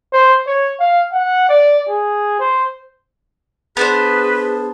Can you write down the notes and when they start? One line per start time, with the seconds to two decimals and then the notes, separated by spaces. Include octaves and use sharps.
0.13 C5
0.47 C#5
0.79 F5
1.12 F#5
1.49 D5
1.89 G#4
2.40 C5
3.77 B3 D4 G#4 B4 C5